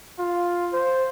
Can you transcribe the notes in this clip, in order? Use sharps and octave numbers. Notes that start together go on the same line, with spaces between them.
F4
C5